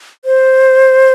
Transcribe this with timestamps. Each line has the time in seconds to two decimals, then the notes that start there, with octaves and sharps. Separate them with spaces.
0.25 C5